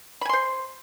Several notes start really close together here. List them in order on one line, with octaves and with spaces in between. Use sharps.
B5 G#5 C6 C5